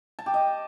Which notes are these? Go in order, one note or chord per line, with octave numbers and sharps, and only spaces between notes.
A5
G4
D#5